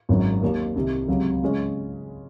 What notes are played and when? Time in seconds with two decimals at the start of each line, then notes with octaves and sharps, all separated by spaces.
0.09 G#1 F#2 D#3 F#3
0.41 D#2 D#3 A#3
0.76 C2 C3 D#3
1.08 C#2 C3 F#3
1.43 C#3 G#3 C#4